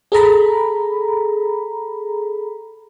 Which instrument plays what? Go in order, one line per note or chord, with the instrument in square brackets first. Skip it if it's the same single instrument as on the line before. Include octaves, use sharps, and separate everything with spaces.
[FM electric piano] G#4 A4 A#5 B5